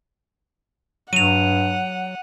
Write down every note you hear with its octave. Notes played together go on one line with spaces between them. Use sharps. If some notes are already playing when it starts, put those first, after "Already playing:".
G2 F#3 F#5 D#7 F7